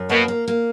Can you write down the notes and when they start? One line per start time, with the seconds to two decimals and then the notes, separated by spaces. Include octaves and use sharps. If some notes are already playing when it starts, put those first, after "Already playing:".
Already playing: F#2
0.09 B2 A#3
0.28 A#3
0.48 A#3